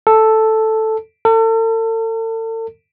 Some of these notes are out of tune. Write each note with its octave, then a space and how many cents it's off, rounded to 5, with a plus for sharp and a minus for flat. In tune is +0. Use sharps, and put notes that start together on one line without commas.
A4 +0
A4 +40